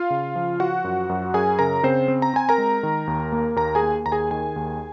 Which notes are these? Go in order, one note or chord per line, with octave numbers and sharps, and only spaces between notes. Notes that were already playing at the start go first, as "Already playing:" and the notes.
Already playing: F4 F5
C#3
F3
F3 F#4 F#5
F#2
F#2
F#2 G#4 G#5
C#3 A#4 A#5
C#3 C4 C5
C4
A#5
C4 G#5
A#4 A#5
G#3
D#3
D#2
A#3
D#2 A#4 A#5
G#4 G#5
A#3
D#2 A#5
G#4 G#5
D#3 G#4 G#5
D#2